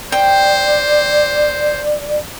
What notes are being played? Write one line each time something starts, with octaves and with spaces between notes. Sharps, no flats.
C5 D5 G5